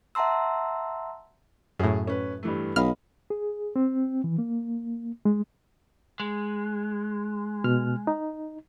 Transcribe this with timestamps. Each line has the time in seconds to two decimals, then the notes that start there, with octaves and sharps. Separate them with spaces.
0.15 E5 F#5 A5 A#5 C6 E6
1.79 F#2 A2 G#4
2.07 C#4 B4
2.43 G2 E3 A3
2.76 B1 D#5 F5 B5 F6
3.30 G#4
3.76 C4
4.24 E3
4.38 A#3
5.25 G#3
6.20 G#3
7.64 B2 F6
8.07 D#4